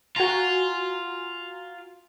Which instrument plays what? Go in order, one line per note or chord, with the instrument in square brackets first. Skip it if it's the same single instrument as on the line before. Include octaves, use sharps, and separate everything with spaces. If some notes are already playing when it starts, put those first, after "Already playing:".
[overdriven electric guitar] F4 [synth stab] F#4 G#5 A#5